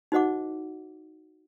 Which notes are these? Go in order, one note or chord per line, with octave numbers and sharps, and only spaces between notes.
D#4 F#4 C5 D#5 F#5 D6